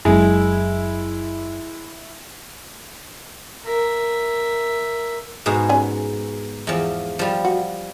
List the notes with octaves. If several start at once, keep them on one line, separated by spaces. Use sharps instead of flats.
F#1 F#3 G#3 E4
A#4 E5
G#2 B2 G#4
C#4 G#5
E2 F3
F3 G3
F#4